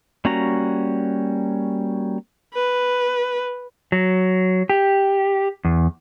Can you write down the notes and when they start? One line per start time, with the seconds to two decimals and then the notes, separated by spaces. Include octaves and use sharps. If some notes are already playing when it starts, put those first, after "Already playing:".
0.25 G3 A#3 C#4 F#4 A#5
2.55 B4
3.92 F#3
4.70 G4
5.65 E2